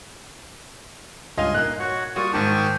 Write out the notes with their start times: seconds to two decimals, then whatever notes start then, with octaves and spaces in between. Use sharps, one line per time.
1.38 C#2 G2 F4 D#5 F5 G#5 C6
1.54 A#2 A#3 D#4 F#6
1.79 F#4 C#5 F#5
2.16 G3 A#3 F4 F#4 D5 C#6 D#6
2.33 G#2 D#3 G4 A5 C#6 D#6